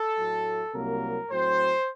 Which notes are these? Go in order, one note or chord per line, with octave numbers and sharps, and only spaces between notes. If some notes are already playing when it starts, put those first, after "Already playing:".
Already playing: A4
A2 F#3 A3
C2 C3 F#3 A#3 A#4
A2 F#3 C4 C5